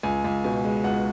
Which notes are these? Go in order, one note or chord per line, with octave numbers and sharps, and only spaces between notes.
C#2 G#5
C#2
B2 G#5
G#3
C#2 F#5